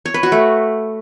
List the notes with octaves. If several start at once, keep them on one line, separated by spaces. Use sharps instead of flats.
C#5
B4
F#4
A3